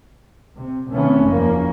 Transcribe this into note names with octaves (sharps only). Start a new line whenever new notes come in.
C3
C3 D#3 E3 A3 B3 C#4
F#1 E2 F3 A#3 C#4